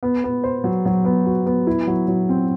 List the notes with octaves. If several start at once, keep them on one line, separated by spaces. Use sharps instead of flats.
B3
B3
C5
F#3
F#3
B3
F#4
B3
E4
F#3
F#3
C4